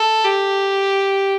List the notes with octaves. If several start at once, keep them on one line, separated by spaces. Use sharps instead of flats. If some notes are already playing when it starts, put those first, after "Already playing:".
Already playing: A4
G4